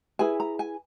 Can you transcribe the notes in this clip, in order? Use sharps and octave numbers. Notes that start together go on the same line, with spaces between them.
E4 G#4 B4 G#5
A#5
G#5